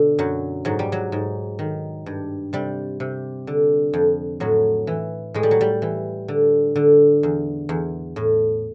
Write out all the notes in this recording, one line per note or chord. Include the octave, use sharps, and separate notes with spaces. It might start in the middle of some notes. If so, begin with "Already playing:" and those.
Already playing: B2 D3
F#2 F#3
G#2 F#3
G3
F#3
G#2
D#3
G2
C3 G3
C3
D3
F2
A2 F#3
E3
A2 G#3
G3
F#3
G3
E3
D3
D3
E2
E2
A2